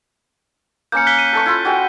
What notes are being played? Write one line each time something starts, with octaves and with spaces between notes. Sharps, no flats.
A#3 C#4 G6 C#7
F#6 B6 G7
D#7
A4 C#6
E4 F4
F#4 G#4 G5